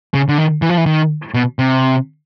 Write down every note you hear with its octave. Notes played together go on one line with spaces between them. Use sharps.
C#3
D3
D#3
E3
F3
E3
D#3
B2
C3